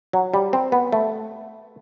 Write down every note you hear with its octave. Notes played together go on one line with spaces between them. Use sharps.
F#3
G3
C4
B3
A3